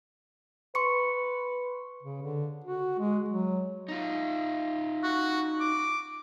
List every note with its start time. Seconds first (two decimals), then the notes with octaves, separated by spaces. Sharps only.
0.75 B4 C6 C#6 C#7
2.03 C#3
2.21 D3
2.64 F#4
2.99 G#3
3.28 F#3
3.88 D#4 F4
5.03 F#4
5.60 D6